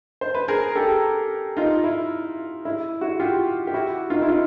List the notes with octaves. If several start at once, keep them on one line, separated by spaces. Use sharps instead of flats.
C5
B4
G#4 A#4
G4 A4
D#4 F4
E4
E4
E4 F#4
F4 G4
G4
E4 F#4
D#4 F4
E4
D#4 F4